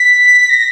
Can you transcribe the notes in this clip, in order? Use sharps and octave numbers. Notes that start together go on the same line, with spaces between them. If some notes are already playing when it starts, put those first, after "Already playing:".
Already playing: B6
A#6